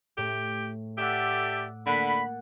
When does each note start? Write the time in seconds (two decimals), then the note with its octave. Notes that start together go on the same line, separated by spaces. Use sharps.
0.17 A2 G4
0.98 G4 A4 D5 E5 F#5 D6 E6
1.86 D3 A#3 F#5 B5 A6